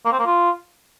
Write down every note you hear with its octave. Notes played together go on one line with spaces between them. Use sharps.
A#3
C4
A#3
F4